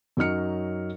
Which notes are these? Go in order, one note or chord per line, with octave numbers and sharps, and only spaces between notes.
F#2 F#3 D#4 F6 C#7